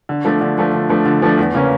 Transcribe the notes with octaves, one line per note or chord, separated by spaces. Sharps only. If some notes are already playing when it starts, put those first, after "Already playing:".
D3
F3 A3 D4
D3
F3 A3 D4
D3
F3 A3 D4
D3
F3 A3 D4
E2
C#3 E3 A#3 C#4